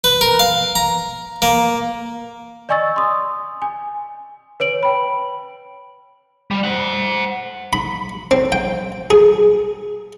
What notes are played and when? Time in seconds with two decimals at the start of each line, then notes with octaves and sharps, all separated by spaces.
0.04 B4
0.21 A#4
0.39 F5
0.75 A#5
1.42 A#3
2.69 D5 D#5 G#5 C#6 E6 A6
2.96 C6 D#6
3.62 G#5
4.60 B4 C#5 D7 F#7
4.83 G5 B5
6.51 G3
6.64 C5 F#5
7.73 B5
8.31 C4
8.52 G5
9.10 G#4